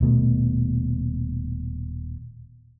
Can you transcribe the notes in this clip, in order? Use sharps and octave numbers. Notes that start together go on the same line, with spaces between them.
D#1 B2 A3